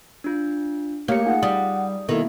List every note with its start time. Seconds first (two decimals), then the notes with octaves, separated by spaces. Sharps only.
0.24 D4 F4
1.08 A3 A#3 G4 C#5 C#7
1.26 D#4 F4 G#4 F#5
1.43 G3 D#6
2.09 B2 D#3 A#3 E4 A4